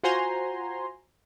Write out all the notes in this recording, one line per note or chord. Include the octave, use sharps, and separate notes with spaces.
F4 F#4 C5 G#5 A#5 C6